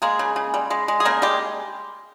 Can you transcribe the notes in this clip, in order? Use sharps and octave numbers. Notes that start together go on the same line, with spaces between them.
G#3 A#3 G#4
C#3
C#3
G3
G#3
G#3
G#4
C#3 A#3 A#4
G3 G#3 G4